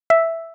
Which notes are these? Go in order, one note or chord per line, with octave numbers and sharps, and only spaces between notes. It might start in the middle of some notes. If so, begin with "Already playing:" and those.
E5